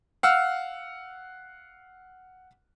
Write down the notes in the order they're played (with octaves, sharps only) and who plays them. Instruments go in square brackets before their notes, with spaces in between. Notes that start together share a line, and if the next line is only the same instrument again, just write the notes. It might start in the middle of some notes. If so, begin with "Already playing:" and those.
[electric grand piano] F5 F#5 E6 F6